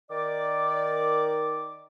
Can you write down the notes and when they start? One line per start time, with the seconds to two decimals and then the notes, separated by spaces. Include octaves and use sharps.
0.11 D#3 D5 D6